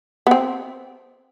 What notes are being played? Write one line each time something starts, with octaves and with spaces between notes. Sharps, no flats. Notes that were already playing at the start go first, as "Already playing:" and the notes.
B3
C4